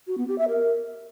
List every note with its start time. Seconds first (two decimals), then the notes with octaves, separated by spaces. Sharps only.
0.07 F#4
0.18 B3
0.28 G4
0.38 E5
0.49 A#4